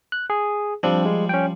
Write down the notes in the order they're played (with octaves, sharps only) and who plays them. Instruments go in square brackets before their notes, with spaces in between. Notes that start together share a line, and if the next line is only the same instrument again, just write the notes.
[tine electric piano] F#6
G#4
[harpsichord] F3 G3 [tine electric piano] C4 D4
[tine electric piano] G#3
C#4 G5